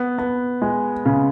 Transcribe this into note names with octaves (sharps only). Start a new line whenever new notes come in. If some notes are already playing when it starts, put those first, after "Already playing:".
Already playing: B3
B3
G#3
C#3